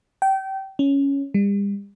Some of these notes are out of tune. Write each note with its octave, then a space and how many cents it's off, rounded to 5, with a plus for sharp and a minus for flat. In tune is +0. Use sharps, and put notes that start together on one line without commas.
G5 -25
C#4 +5
G3 +40